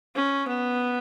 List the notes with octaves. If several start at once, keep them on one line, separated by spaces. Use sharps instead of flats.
C#4
B3